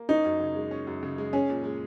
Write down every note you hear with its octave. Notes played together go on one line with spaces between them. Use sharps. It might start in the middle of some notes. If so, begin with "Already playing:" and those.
Already playing: A#3
C#4 D#4
F#2
C#3
G#3
C#4
F#2
C#3
G#3
C#4 G#4
A#2
G#3